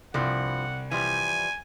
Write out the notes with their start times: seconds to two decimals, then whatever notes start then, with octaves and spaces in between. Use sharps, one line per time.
0.14 C2 G2 F3 F#5
0.91 E3 F3 G3 G#5